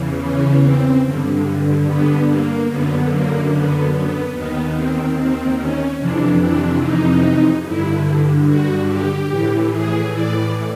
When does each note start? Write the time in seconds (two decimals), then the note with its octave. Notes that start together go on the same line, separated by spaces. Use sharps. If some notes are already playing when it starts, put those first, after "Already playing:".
Already playing: E2 C#3 E3
0.22 C#4
0.63 C4
1.04 G2 D3
1.86 B3
2.29 A#3
2.69 F#2 D3 B3
3.10 A#3
3.52 B3
3.93 B3
4.34 D#2 D#3 B3
4.75 C4
5.17 C4
5.57 C#4
5.99 F2 C3 E3 D4
6.41 D4
6.82 D#4
7.65 G2 D3 E4
8.47 F#4
8.88 G4
9.29 A2 E3
9.71 G#4
10.13 D5